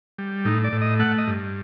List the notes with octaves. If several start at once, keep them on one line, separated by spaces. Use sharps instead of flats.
G3
A2 D#4
D5
A2
D#5
A3 F#5
D#5
G2